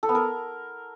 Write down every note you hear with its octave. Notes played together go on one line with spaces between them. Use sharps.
A4
B3
A#4